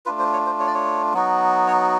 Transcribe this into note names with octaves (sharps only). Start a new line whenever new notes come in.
A3 D4 F4 B4
C5
C#5
C5
C#5
D5
C#5
F#3 B3 D#4 F#4
C#5